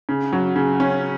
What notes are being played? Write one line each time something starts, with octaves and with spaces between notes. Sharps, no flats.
C#3
F#3
C#3
C#4